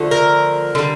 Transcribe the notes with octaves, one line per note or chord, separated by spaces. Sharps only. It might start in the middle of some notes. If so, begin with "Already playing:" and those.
Already playing: D3 F3 A3
A#4
D3 G3